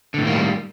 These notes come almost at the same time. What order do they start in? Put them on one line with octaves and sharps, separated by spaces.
D3 A2 D#3 A#3 G3